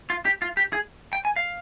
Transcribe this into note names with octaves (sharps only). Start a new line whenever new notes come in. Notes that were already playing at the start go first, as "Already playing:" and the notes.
F4
G4
F4
G4
G#4
G5
G#5
F5